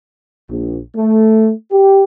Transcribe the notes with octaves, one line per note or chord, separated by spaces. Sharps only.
A#1
A3
G4